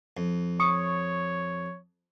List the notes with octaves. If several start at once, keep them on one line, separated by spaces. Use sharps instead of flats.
F2
C#5 C#6 D#6 C#7